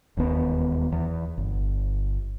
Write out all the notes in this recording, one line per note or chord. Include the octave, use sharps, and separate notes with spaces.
E1 D#2 B3
E2
G1